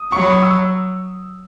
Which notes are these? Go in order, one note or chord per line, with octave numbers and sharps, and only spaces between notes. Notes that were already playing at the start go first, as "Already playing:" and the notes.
Already playing: D#6
F#3 C#6
B5
C#6
E6